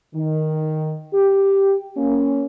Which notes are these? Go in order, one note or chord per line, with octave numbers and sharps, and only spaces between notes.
D#3
G4
A#3 C#4